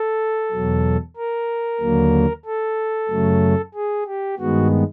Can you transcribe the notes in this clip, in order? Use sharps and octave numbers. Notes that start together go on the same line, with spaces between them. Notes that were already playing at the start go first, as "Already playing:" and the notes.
Already playing: A4
E2 B2 F#3
A#4
D#2 D3 F#3 A#3
A4
F#2 C#3 F#3 A3
G#4
G4
G2 D#3 G#3 B3 F#4